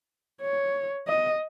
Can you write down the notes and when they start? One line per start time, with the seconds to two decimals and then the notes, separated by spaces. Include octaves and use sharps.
0.41 C#5
1.07 D#5